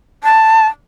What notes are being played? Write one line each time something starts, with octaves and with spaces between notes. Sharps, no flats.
A5